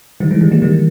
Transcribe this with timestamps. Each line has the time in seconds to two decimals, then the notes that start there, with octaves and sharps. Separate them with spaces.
0.20 D#3 G3
0.31 E3 G#3
0.41 D#3 G3
0.51 G3 A#3
0.62 D#3 G3